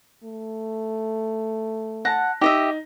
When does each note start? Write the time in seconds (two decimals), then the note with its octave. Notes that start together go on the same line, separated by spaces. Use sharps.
0.24 A3
2.05 F#5 A5 A#6
2.41 D#4 G4 D#5 E5